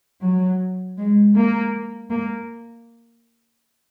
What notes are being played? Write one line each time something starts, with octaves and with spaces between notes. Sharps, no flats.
F#3
G#3
A#3
A#3